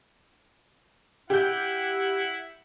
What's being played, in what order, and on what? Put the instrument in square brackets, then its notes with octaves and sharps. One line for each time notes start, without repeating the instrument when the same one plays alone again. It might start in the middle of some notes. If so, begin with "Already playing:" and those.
[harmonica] E4 F#5 [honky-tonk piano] G4 G6